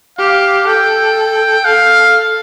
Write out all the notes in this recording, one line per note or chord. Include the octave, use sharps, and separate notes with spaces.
G4 F5
A4 G5
A4 F5